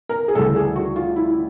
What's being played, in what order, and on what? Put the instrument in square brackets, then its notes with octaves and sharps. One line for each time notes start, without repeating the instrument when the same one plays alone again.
[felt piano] A#4
G#4
D2 C#3 E3 G3 A4
G#4
F#4
F4
E4